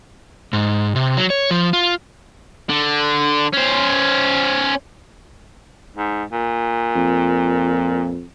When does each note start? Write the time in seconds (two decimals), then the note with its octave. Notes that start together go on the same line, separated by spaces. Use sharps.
0.53 G#2
0.96 C3
1.17 F#3
1.30 C#5
1.51 F3
1.73 F4
2.69 D3
3.53 C#4 C5
5.96 G#2
6.32 A#2
6.95 F2